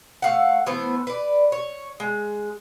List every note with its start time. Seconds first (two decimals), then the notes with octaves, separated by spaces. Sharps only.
0.22 A3 F5 F#5
0.66 E3 A3 B3 C5
1.07 B4 D5
1.52 C#5
2.00 G#3